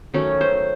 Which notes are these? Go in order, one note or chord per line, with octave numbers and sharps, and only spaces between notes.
D#3 F#3 A3 C#4
C5